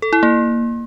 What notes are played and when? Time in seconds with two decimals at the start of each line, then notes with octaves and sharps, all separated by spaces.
0.02 A4
0.13 E4
0.23 A#3